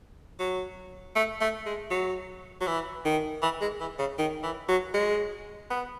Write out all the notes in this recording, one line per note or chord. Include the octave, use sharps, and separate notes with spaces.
F#3
A3
A3
G#3
F#3
F#3
E3
D#3
E3
G#3
E3
C#3
D#3
E3
F#3
G#3
B3